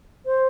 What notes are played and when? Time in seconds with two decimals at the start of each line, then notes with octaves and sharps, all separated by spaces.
0.25 C5